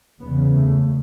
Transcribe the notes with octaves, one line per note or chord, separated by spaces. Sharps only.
E2 C#3 B3
A3